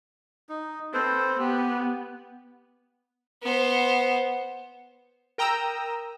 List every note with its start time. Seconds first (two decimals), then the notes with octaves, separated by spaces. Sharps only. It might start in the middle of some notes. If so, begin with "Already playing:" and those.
0.49 D#4
0.94 C4 A4 B4 C5
1.39 B3 G4
3.42 B3 C5
5.38 A#4 G5 A#5 D#6 E6